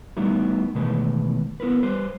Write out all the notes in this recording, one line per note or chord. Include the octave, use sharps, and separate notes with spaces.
G3 A3 B3 D#4 E4 F#4
B2 D#3 E3 G#3 A3 B4
B3 E4 A#4 B4
G3 B4 C5